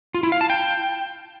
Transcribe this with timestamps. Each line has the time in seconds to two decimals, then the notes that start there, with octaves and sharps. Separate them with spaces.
0.14 F4
0.23 E4
0.32 F5
0.41 A5
0.50 G5